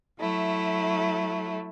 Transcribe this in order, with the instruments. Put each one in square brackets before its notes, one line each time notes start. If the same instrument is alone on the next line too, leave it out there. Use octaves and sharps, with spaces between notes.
[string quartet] F#3 A3 E4